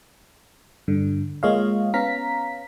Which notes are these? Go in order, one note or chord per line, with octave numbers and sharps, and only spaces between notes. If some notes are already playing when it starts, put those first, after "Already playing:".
G2 D3
G#3 A#3 F4 C#5 D#5 F5
B3 C#4 F5 A#5 B6